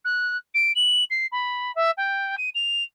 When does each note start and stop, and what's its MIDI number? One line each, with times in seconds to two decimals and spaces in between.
0.05 0.37 90
0.54 0.72 98
0.75 1.04 102
1.10 1.27 96
1.32 1.74 83
1.75 1.91 76
1.97 2.36 79
2.38 2.50 99
2.55 2.83 101